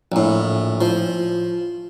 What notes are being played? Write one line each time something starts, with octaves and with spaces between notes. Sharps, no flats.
A#1 A2
F3